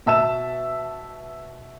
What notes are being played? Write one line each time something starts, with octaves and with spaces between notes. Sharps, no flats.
B2 E5 A5 E6 E7